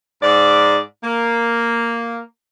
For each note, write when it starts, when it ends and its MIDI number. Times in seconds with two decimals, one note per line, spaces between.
0.23 0.78 44
0.23 0.78 74
1.04 2.19 58